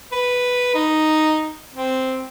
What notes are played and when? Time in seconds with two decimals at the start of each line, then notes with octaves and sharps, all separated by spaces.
0.12 B4
0.74 D#4
1.74 C4